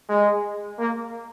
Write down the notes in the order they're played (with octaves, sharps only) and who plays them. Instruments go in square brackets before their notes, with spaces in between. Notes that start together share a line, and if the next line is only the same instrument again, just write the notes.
[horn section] G#3
A#3